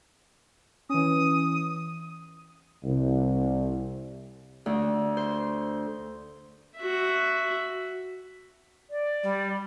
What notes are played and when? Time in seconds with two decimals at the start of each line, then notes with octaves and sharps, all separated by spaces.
0.90 E3 C#4 D#6
2.83 C2
4.66 D2
5.17 C5
6.78 F#4 E5
8.90 D5
9.23 G3